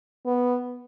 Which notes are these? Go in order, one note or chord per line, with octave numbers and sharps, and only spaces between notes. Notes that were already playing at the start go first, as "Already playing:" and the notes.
B3